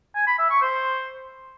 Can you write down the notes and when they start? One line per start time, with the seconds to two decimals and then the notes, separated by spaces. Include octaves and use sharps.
0.15 G#5
0.27 B5
0.39 E5
0.50 C#6
0.62 C5